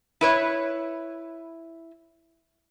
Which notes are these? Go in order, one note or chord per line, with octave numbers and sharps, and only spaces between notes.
E4 B4 C#5